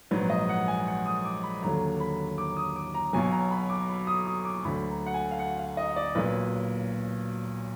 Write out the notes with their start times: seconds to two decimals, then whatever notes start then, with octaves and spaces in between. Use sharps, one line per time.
0.11 A#1 G#2 F#3 B4
0.30 D#5
0.49 F#5
0.68 G#5
0.87 F#5
1.06 D#6
1.25 D6
1.43 B5
1.63 D#2 D3 F#3 A#5
2.00 B5
2.38 D6
2.57 D#6
2.76 D6
2.94 A#5
3.13 B1 B2 F#3 G#5
3.32 A#5
3.51 B5
3.70 D6
3.89 B5
4.07 D#6
4.26 D#6
4.45 D6
4.64 D2 D3 F#3 B5
4.89 A#5
5.06 F#5
5.14 G#5
5.31 F5
5.39 F#5
5.58 F5
5.77 D#5
5.96 D5
6.15 B1 A#2 F#3 B4